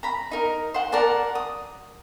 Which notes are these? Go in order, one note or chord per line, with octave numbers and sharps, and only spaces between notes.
A#5 B5
D#4 A#4
C5 F#5
A#4 D5 F#5 A5
D#6